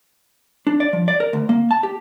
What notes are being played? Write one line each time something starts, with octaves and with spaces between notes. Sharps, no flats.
D4
D5
F3
D5
A#4
D2
A#3
A5
G4